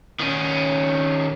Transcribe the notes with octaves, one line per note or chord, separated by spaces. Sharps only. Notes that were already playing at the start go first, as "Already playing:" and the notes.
D#3 C#4